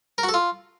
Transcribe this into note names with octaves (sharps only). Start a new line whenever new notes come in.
A#4
F#4
A4
F4